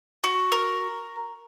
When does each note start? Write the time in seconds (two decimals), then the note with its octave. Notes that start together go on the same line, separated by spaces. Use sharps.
0.24 F#4
0.52 A#4